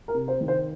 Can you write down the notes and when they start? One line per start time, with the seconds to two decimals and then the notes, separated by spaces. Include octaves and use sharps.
0.08 A#4
0.14 C3
0.28 C5
0.41 D#3
0.48 C5